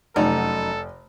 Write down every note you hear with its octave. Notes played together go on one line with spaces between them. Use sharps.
F1 F#2 D#4 A4